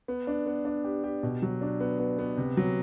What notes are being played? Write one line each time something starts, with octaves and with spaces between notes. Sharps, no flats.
B3
D4
B3
D4
G4
G4
B2
F#3
D4
B3
B3
B3
C3
F#3